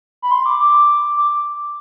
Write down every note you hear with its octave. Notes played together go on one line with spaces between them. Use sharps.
B5
C6
D6
D6
D6